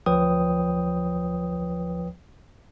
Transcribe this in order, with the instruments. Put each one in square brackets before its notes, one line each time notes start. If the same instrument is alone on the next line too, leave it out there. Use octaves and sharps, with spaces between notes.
[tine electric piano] D2 F3 B4 C#5 G5 D#6